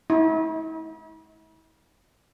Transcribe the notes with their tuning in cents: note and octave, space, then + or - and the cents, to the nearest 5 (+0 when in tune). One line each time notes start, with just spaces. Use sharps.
E4 -45